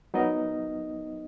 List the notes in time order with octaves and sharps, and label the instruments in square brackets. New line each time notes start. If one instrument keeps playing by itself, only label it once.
[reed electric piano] F#3 B3 D#4 A#4 D#5